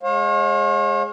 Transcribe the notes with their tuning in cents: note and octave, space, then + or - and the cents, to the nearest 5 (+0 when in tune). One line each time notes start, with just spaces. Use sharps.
G#3 +0 C#5 -40 F5 +30